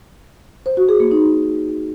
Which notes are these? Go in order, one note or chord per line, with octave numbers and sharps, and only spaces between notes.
C5
F#4
G#4
A#3
D#4